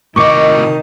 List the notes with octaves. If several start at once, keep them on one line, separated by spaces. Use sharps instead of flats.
A2 C3 D#3 D#4 D#5 C#6 D6 C#7